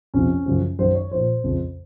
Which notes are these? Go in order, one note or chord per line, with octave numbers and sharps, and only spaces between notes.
F2 C3 F3 C#4
F#2 C#3 F3
F#2 D#3 C5
C#5
A#2 F3 C5
F2 C#3 F3